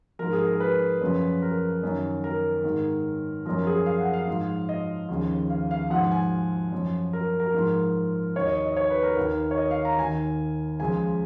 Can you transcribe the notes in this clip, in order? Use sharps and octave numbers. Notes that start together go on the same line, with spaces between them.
G#2 F3 A#4
G#4
A#4
B4
F#2 C#3 F3
A#4
F#2 D#3
A#4
G#2 D#3
F#2 F3 A#4
G#4
F5
F#5
F5
G#2 F3
D#5
D#2 C#3 F3
F5
F5
G#2 F3 F#5
G#5
F#2 F3
A#4
A#4
G#2 F3
D#2 D#3 C#5
D#5
D#5
C#5
B4
A#4
D#2 D#3
C#5
D#5
F5
A#5
D#2 D#3 G#5
C#2 C#3 F3 G#5